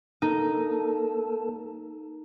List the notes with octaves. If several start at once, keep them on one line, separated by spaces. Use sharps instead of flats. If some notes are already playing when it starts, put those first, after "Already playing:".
A#3 D#4 A4